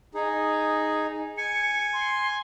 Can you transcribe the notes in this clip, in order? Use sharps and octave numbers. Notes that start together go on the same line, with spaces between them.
D#4 G#4
G#5 C#7
C6